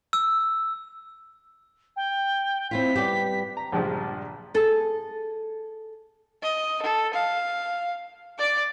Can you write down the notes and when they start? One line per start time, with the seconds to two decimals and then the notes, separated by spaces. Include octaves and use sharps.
0.13 E6
1.96 G5
2.71 C4 E4 F4 B6
2.96 G3 B3 G4
3.57 A#5
3.72 A#1 G2 F3 G#3
4.54 G#4 A4
6.43 D#5
6.82 A4
7.14 F5
8.39 D5 D6